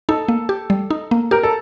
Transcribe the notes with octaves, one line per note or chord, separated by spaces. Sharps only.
D#4 A4
A#3
G4
G3
D#4
A#3
G4 A#4
A4